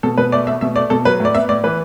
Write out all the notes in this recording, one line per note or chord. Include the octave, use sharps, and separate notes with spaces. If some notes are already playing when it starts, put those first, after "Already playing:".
B2 A4
B2 B4
A3 D5
A3 E5
B2 E5
A3 D5
B2 A4
F#3 B4
A2
D5
B3 E5
A2 D5
E3 B4